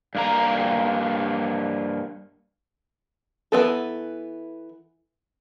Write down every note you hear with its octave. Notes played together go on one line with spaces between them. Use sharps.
G2 A#3 A#5
E3 B3 A4